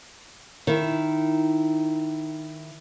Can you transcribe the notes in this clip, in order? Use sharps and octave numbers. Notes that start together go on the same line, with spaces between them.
D#3 E4